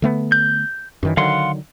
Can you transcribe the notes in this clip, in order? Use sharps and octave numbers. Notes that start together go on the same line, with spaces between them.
D3 A3 B3
G6
F#2 D#3 E3
D3 D#3 F#3 F5 F#5 C6